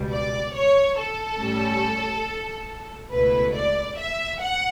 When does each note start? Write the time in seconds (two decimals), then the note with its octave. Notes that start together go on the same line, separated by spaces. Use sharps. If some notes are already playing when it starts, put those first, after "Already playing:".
Already playing: C#2 B2 G3
0.10 D5
0.53 C#5
0.97 A4
1.38 A2 G3 C#4
3.10 C#2 B2 A3 E4 B4
3.54 D5
3.96 E5
4.39 F#5